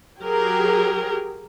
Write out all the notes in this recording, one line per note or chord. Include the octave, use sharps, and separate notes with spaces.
F#3 G4 G#4 A#4